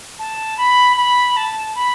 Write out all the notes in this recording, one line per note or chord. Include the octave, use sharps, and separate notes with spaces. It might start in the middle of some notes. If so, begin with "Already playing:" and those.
A5
B5
B5
A5
B5